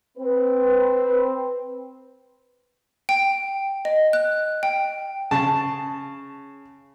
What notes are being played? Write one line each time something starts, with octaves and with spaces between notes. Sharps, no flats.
C4 B4
G5
D#5
F#6
G5
C#3 A5